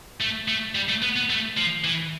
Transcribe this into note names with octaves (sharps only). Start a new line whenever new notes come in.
A3
A3
G3
A3
B3
B3
A3
F3
E3